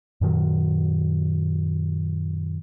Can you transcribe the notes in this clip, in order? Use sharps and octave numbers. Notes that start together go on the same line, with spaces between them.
F#2 A#2 D#3 F#3